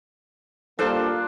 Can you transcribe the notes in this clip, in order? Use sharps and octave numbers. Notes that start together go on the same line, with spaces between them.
G3 A#3 D4 F4 A4 C5